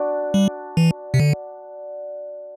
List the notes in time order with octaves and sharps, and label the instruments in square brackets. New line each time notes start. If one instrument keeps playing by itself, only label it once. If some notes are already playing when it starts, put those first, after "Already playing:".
Already playing: [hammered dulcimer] D4 F#4
[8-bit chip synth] G3
E3
C3
D3